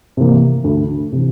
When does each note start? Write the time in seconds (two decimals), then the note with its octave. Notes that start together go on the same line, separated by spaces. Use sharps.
0.17 C3 E3 A#3
0.64 D2
1.12 C3 E3